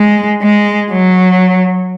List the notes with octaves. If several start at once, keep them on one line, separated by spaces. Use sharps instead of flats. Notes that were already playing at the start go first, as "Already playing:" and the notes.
Already playing: G#3
G#3
F#3